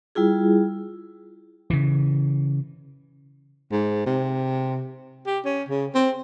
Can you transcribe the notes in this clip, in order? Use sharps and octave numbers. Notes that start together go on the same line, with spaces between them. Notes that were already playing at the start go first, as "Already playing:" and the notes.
G3 E4 F4 G#4
C#3 E3
G#2
C3
G4
C#4
C#3
C4